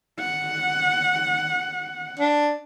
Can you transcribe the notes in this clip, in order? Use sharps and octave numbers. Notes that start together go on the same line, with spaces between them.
F#5
D4